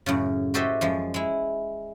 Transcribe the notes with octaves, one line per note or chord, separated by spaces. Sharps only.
F#2 A2 C#3
F#4 G4 A4 C5 D#5 E5
F#2 F3 G#3
G#3 E4